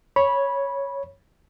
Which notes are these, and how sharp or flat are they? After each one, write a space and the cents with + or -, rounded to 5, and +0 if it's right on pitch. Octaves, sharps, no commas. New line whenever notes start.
C#5 +0 B5 -15